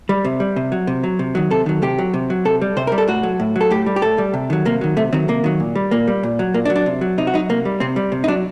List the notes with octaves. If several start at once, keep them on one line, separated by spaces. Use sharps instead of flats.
G3
C3
G3
C3
F#3
C3
F#3
C3
D#3 F#3
C3 A4
D#3 F#3
C3 G4
F#3
C3
F#3
C3 A4
G3
C3 C5
A#4
G3
A4
A2 F#4
F#3
A2
F#3
A4
A2 G4
G3
G4
A2 A4
G3
C3
D#3 F#3
C3 A#3
D#3 F#3
C3 A3
D#3 F#3 C4
C3 A#3
D#3 F#3
A#2
G3
A#2 A#3
G3
A#2
F#3
A#2 A#3
D4
F#3
D4
C3
F#3
C3 D#4
F#4
F#3 D#4
C3 A#3
G3
C3 C4
G3
C3
D#4
F#3 D4